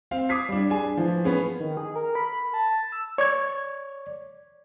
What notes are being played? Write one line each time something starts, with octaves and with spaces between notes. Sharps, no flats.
C4 F5
D6 D#6 G#6 B6 C7
G3 D4
D4 G#4 G#5
E3 F3
B3 C#4 G#4
D#3
G#4
A#4
B5
A5
E6
C#5 D5 G#6